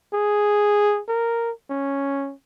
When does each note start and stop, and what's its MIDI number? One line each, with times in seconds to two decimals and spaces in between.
0.13 1.00 68
1.08 1.51 70
1.70 2.33 61